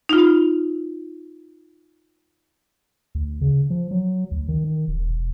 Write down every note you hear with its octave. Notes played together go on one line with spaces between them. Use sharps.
D#4 F4
D2
C#3
F3
F#3
D2
D#3
D#3
D#1
E1